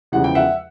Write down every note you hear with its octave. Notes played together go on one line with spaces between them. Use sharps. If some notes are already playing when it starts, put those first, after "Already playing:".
E2 C#3 F3 G#3 F#5
G5
E5 F#5